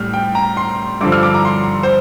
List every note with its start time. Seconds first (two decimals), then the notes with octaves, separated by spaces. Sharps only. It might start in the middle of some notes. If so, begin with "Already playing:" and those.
Already playing: A2 G3 F6
0.13 G5
0.35 A#5
0.57 C6
1.01 G2 D3 F3 D6
1.12 F6
1.23 D6
1.34 A#5
1.45 C6
1.83 C5